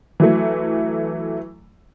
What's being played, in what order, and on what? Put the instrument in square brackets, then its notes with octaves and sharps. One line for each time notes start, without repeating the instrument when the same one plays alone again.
[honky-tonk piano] E3 F#3 A3